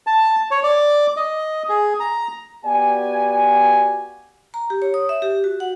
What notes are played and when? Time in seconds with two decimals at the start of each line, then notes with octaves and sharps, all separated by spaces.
0.07 A5
0.51 C#5
0.63 D5
1.17 D#5
1.69 G#4
2.00 A#5
2.65 B3 F#4 G4 D5 G#5
4.54 A#5
4.70 G4
4.82 C#5
4.94 D#6
5.09 E5
5.22 G4
5.44 F#4
5.60 F#5